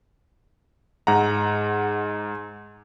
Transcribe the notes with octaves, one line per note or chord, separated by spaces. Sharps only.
G#2 F#5 A#5